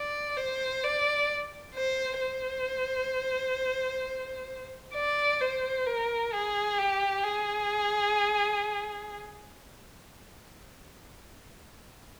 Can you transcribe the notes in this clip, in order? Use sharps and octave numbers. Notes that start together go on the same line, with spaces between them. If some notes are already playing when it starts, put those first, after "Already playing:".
Already playing: D5
C5
D5
C5
C5
D5
C5
A#4
G#4
G4
G#4